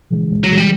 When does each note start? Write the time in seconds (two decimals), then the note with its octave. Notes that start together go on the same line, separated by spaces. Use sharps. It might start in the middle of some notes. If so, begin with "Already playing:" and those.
0.10 C#3 E3 G#3
0.31 C#2
0.44 F#3
0.50 C#3 E3 G#3
0.57 G3